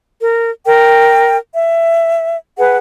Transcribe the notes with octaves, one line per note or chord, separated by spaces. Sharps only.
A#4
A#4 G5
E5
G#4 B4 F#5